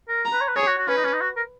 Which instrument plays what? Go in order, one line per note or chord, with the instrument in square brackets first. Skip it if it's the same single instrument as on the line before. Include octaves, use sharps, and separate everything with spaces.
[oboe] A#4
[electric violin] A#5
[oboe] B4
C#5
B4
[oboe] G#4 [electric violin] C#5
[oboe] F#4
F#4
[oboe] C#4 [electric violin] B4
[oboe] D#4
C#4
D#4
F#4
A#4